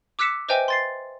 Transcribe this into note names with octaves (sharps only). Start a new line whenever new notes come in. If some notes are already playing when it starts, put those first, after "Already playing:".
D6 E6 F#6 B6 C#7 E7
B4 C5 D#5 E5 G5 G#5
C6 A6 C7